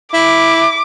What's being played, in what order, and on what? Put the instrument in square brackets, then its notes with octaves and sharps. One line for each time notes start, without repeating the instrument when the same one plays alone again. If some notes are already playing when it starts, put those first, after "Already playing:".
[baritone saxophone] E4 [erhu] D6